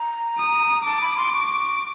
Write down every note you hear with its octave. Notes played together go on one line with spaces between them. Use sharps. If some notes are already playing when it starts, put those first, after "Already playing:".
Already playing: A#5
D#6
A5 D6
B5
C6
C#6